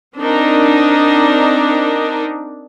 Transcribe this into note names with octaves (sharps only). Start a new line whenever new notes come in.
C4 D4 D#4 A#4